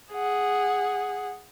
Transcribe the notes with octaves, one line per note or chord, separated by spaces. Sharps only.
G#4 F#5